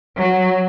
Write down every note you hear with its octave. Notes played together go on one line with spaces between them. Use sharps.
F#3